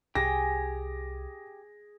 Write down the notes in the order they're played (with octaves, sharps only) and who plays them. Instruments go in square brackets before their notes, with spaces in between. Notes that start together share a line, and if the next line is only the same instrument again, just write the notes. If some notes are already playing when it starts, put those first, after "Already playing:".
[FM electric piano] C2 [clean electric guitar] G4 [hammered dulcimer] G#4 [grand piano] A#6